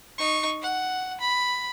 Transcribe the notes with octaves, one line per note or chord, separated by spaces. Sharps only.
D#4 C#6
F#5
B5